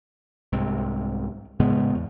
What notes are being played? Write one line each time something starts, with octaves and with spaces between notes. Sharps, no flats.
C2 G#2 C3
A2 C#3 G#3 B3
E2